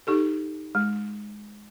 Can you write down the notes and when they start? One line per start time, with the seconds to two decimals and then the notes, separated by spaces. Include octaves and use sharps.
0.07 D#4 G4 A4
0.75 G#3